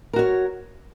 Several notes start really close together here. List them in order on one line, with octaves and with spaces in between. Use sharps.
A#4 F#4 C#5